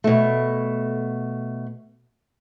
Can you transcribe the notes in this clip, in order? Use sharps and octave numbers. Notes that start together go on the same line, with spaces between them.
B2 A3